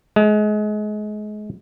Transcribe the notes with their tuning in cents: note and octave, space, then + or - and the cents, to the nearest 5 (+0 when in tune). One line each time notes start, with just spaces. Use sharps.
G#3 +30